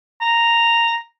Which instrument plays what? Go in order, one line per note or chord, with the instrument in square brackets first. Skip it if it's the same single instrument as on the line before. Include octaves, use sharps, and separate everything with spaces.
[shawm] A#5